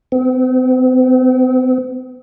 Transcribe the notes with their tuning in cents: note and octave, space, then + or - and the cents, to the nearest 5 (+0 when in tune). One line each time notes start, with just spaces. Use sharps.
C4 -45